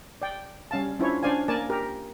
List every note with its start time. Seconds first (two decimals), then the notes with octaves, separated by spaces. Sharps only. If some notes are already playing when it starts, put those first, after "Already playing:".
0.22 D5 G5
0.71 G3 C#4 F5 A5
0.99 C#4 D4 E4 F4 C5 C#5
1.23 C#4 D4 C5 D5 F5 G#5
1.48 A#3 A#4 D5 G#5 A5
1.70 G4 A#4